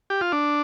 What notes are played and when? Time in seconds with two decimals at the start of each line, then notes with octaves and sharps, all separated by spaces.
0.10 G4
0.21 F4
0.32 D4